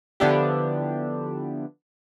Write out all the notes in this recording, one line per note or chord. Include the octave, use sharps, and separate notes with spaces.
D3 F3 B3 D4 E4 G4